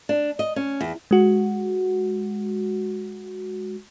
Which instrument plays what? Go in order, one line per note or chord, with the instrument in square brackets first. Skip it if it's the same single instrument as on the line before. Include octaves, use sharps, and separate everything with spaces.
[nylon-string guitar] D4
D#5
C#4
E2
[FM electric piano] G#3 F#4